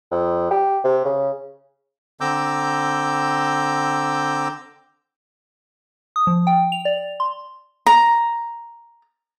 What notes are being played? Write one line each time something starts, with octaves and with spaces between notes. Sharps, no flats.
F2
G4
C3
C#3
D3 C4 A#5 D6 E6 G6
D#6
F3
G5
F7
D5
C6
A#5